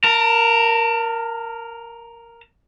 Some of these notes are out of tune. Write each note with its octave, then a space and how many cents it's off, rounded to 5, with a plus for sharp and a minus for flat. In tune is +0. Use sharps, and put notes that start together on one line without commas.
A#4 +0 A5 +40